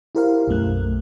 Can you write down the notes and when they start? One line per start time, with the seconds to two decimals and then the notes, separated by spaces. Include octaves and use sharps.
0.15 E4 G4 A#4 C5 F5
0.48 B1 F#2 A3 F#6